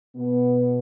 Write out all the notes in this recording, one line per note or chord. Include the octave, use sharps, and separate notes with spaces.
B2 B3